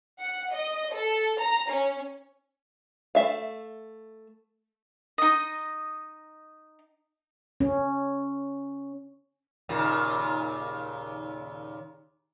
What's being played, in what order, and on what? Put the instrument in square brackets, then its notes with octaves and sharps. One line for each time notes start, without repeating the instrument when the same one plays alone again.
[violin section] F#5
D#5
A4
A#5
C#4
[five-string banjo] A3 E5 F5
[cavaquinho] D#4 D#5
[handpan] C#4
[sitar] D#2 A#2 C#3